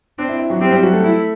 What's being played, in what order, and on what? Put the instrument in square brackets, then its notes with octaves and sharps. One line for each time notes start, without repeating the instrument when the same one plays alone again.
[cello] C4 [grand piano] D4
[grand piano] E4
E4
F#3 F#4
[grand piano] G3 G4 [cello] C4
[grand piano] G3 G4
F#3 F#4
A3 A4
[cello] E4